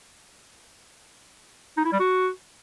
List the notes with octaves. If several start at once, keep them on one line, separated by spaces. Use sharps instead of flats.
D#4
E4
G3
F#4